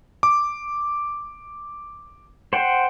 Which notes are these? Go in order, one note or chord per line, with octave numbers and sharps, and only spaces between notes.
D6
C5 F#5 G5